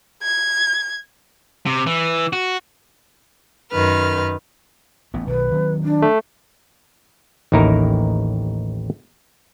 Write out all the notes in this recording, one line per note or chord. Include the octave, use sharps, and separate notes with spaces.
G#6
C3
E3
F#4
F#2 D#3 B4 F6
A1 B3
B1 D#3 B4
D#3 F#3 C4
D4
A3
A1 D#2 D#4 E4 A#4 A#5